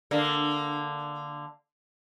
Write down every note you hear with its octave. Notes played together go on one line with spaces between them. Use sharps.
D3 A#3